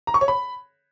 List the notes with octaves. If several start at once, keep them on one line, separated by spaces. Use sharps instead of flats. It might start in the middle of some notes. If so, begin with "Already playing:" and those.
A#5
C#6
C#5
B5